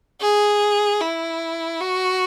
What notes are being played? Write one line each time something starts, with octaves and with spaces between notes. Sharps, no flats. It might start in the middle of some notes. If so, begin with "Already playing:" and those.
G#4
E4
F#4